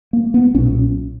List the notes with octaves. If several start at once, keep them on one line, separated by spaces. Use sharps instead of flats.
A#3
B3
B1 A#2 C#4